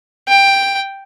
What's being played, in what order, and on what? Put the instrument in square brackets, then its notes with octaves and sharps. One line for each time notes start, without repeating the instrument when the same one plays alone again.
[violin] G5